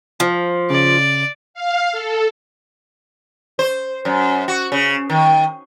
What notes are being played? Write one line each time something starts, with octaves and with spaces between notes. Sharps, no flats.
F3
C#3 D5
F5
A4
C5
F#2
F#4
C#3
D#3